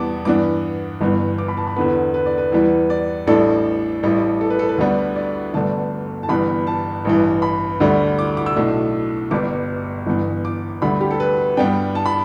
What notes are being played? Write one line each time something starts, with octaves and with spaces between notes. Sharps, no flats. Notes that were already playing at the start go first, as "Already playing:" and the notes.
Already playing: E2 E3 G3 B3 A5 D6
G2 E3 B3 D4 D6
G1 G2 E3 B3
D6
B5
A5
B5
E2 D3 B3 B4
B4
D5
B4
E2 E3 G3
D5
A1 A2 G3 D4 A4
A1 A2 G3
A4
B4
A4
B4
D2 D3 G3 B3 D4
D5
G1 G2 D3 A3 D4 A5
A5
G1 G2 E3 G3 B3 B5
A5
A1 G2 E3
B5
D2 D3 G3 D4
D6
D6
E6
B1 A2 A3 D4
G1 G2 G3 D6
G1 G2 E3 B3
D6
D2 D3 G3 B5
G4
A4
B4
G2 G3 B3 D4 G5
A5
B5